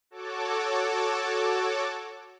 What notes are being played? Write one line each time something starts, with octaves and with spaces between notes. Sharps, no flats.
F#4 A4 C#5 A5 D6